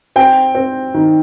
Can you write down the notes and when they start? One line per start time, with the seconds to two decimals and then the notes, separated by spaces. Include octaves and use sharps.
0.16 C4 G5
0.55 C4
0.94 D#3